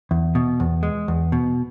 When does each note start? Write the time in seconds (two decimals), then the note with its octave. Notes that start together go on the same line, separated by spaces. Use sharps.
0.11 E2
0.35 B2
0.60 E2
0.83 G#3
1.08 E2
1.32 B2